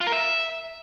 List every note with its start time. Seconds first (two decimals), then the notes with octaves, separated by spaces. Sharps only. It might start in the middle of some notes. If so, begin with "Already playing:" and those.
0.01 F4
0.07 A#4
0.12 E5